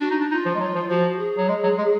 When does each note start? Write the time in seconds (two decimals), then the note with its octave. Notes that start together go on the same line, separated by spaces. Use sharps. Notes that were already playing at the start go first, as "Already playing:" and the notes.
0.01 D4 F#4
0.11 D#4
0.20 D4
0.31 D#4 F4
0.45 F3
0.55 G#3
0.60 F#3
0.75 F3
0.89 F3 F#4
1.19 G#4
1.37 F#3
1.48 G#3
1.63 F#3
1.78 G#3